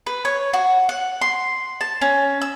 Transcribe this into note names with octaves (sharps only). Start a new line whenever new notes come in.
B4
C#5
F#4
F#5
C6
A5
C#4
E6